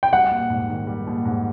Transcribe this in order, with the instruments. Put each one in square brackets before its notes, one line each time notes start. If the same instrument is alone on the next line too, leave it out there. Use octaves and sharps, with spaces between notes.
[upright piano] G5
[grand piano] G3 [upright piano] F#5
[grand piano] A#1
G#2
D#3
G3
A#1
G#2